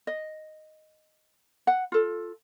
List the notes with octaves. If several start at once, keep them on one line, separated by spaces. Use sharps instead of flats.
D#5
F#5
F4 A4